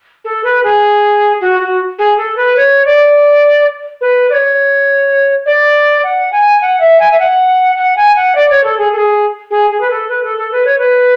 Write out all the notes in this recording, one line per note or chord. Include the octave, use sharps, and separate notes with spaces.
A4
B4
G#4
F#4
F#4
G#4
A4
B4
C#5
D5
B4
D5
C#5
D5
F#5
G#5
F#5
E5
G#5
E5
F#5
F#5
G#5
F#5
D5
C#5
A4
G#4
A4
G#4
G#4
G#4
B4
A4
B4
A4
A4
B4
C#5
B4